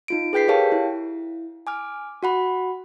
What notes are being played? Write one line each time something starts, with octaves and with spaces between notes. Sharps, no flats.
D#4 F4 D7
G#4 B4 G5 G6 B6 C7
G4 A#4 C#5 F5 G5 A5
E4
G#5 D6 F6
F#4 F#5 B5